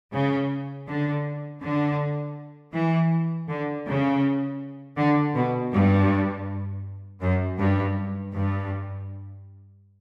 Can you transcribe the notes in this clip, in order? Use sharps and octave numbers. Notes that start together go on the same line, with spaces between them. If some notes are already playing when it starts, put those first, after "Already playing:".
C#3
D3
D3
E3
D3
C#3
D3
B2
G2
F#2
G2
G2